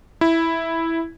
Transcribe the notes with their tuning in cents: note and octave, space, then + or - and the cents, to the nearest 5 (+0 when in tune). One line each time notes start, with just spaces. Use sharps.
E4 -5